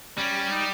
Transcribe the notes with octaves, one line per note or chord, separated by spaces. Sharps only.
G3 C#4
D#4